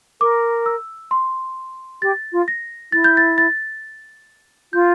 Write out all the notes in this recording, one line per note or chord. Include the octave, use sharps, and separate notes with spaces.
A#4 D6
E6
C6
G4 A6
F4
A#6
E4 A6
G6
A6
A6
F4 G6